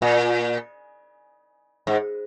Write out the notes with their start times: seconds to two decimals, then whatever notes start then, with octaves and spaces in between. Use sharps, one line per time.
0.02 A#2
1.87 G#2